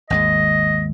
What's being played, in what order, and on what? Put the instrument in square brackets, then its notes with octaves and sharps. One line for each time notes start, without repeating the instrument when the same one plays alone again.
[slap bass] G#1 D#2 G#3 [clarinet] D#5